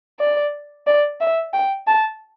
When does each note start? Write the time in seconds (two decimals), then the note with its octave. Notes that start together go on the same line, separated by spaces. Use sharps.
0.20 D5
0.87 D5
1.20 E5
1.53 G5
1.87 A5